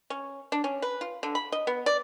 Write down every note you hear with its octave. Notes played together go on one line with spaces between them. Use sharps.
C#4
D4
C#4
B4
F4
D3
B5
D#5
B3
D5